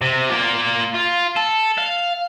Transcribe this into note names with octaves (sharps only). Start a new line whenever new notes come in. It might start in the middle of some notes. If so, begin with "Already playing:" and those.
C3
A#3 F4
F4
A4
F5